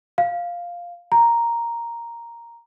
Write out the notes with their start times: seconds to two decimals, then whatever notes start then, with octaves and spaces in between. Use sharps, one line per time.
0.18 F5
1.12 A#5